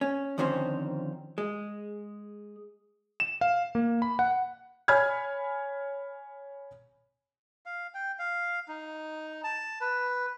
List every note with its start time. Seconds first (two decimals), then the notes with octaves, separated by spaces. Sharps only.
0.01 C#4
0.38 F2 D3 D#3 C4 C#4 C5
1.38 G#3
3.20 E7
3.41 F5
3.75 A#3
4.02 B5
4.19 F#5
4.88 C#5 G#5 B5 F6 G#6
7.66 F5
7.94 G5
8.19 F5
8.68 D#4
9.44 A5
9.81 B4